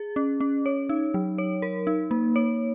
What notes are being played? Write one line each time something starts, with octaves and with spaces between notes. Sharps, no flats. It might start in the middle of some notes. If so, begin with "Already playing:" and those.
Already playing: G#4
C#4
C#4
C#5
D#4
F#3
C#5
A#4
D#4
A#3
C#5